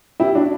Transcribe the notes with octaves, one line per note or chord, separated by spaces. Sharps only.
E4 G4
D4 F#4